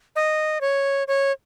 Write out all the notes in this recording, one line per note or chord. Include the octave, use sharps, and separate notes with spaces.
D#5
C#5
C#5